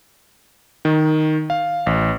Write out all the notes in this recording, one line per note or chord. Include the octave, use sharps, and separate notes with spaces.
D#3
F5
A1